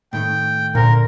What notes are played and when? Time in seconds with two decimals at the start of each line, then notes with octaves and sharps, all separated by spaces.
0.13 A2 D#3 A3 G5
0.75 A#2 D3 A#4 C5